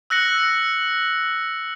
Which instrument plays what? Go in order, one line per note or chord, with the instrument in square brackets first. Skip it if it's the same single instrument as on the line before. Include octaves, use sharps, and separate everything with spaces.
[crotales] E6 F#6 A#6 C#7 F#7